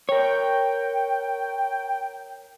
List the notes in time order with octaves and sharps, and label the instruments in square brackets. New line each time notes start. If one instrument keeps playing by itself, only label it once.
[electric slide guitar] A#4 C#5 [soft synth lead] G5